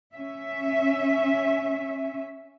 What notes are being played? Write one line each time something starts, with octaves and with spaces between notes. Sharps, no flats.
C#4 E5